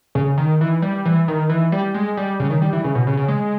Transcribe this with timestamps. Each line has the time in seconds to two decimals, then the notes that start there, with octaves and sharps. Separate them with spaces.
0.15 C#3
0.38 D#3
0.61 E3
0.82 G3
1.05 E3
1.28 D#3
1.49 E3
1.72 G3
1.94 G#3
2.17 G3
2.40 C#3
2.50 D#3
2.62 G3
2.73 E3
2.84 C#3
2.95 B2
3.07 C#3
3.17 C#3
3.28 G#3